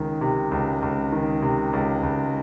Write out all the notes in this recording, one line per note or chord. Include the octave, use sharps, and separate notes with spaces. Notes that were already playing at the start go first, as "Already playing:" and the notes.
Already playing: C#2 D#3
C3
C#2
C#2
D#3
C3
C#2
C#2